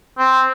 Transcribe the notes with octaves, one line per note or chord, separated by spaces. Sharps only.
C4